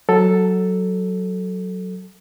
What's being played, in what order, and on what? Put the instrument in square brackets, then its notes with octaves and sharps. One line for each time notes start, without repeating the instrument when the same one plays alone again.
[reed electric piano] F#3 A4